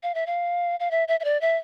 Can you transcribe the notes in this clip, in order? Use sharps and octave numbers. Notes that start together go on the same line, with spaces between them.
F5
E5
F5
F5
E5
E5
E5
D5
E5